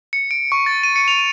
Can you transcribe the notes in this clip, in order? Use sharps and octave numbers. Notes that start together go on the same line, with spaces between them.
C#7
D7
C#6
A6
D#7
C#7
F7